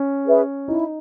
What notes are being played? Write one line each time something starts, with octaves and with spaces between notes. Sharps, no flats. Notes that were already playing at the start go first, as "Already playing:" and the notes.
Already playing: C#4
G#4 B4 E5
D#4 E4